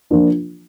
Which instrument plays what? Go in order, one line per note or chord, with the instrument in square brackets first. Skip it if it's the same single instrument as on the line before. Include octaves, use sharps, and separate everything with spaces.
[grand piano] F3 A#3 D4 F4